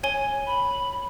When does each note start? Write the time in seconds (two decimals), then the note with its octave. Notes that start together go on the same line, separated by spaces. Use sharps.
0.03 C#5 G#5 G7
0.47 B5